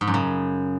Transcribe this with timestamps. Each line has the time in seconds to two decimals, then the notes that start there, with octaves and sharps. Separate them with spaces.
0.01 G#2
0.07 F#2
0.14 C#3